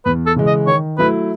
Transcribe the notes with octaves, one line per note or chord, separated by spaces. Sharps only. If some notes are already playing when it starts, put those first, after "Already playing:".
E2 B4
A4
C#3 E3 G#3
D#5
D#3 C#5
F#3 A3 E4 B4